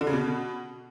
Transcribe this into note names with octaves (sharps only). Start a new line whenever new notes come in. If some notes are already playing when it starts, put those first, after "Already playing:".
D3
C#3
B2